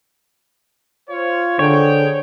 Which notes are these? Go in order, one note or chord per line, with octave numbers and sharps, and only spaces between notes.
F4 C5 C#5
D3 G#4 C5 C#5 G5